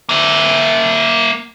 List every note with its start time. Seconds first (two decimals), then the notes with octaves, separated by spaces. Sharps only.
0.09 A#3 E5